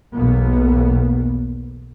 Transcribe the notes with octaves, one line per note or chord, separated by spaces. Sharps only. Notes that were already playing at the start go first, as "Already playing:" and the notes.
B1 E2 B2 A#3 B3